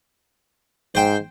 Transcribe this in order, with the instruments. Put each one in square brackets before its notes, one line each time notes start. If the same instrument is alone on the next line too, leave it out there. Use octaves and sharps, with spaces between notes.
[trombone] G#2 [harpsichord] C5 G5